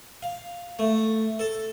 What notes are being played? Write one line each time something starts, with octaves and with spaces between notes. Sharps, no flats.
F5
A3
A4